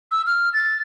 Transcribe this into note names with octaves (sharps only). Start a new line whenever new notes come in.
E6
F6
A6